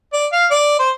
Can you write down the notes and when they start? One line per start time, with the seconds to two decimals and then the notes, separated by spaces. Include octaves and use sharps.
0.13 D5
0.32 F5
0.51 D5
0.79 C5